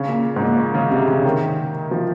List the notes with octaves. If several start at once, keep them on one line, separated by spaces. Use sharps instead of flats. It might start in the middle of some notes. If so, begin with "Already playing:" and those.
Already playing: C#3
A#2
G#2
A#2
C#3
C3
C#3
D#3
F3